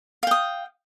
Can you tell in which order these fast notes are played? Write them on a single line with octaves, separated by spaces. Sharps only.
F5 G5 D#6